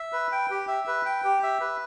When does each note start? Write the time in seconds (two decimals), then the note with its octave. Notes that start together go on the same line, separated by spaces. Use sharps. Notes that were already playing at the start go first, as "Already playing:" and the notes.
Already playing: E5
0.13 B4
0.32 G5
0.50 G4
0.68 E5
0.87 B4
1.05 G5
1.24 G4
1.43 E5
1.61 B4